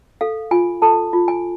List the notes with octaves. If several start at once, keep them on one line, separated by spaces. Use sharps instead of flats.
A4 F5
F4 G#5
A4 A5
F4
G#5